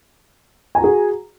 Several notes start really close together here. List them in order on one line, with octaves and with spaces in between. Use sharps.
G#5 A#5 F#4 G#4